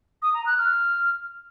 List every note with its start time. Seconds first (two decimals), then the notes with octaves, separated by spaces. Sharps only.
0.22 D#6
0.34 A#5
0.46 F#6
0.58 F6